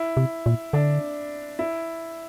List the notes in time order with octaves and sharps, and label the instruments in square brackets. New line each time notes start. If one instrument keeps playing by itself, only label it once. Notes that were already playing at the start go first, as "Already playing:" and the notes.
Already playing: [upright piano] E4
[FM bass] C3
A#2
[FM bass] D3 [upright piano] D4
[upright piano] E4